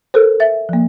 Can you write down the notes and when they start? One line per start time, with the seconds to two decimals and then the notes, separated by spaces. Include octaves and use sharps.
0.14 A4 A#4 C5
0.40 E5 A6
0.69 F3 A#3